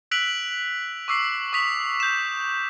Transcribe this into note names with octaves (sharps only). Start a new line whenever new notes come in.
E6 F#6 B6 D7 F7 F#7
C#6 D6 E6 C7
C#6 D#6 B6 F7
G6 E7